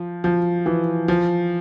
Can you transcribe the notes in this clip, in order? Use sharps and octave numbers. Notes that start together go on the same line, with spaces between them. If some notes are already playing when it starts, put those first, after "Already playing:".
Already playing: F3
F3
E3
F3